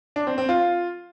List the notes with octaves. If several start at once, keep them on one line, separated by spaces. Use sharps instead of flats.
D4
C4
C4
F4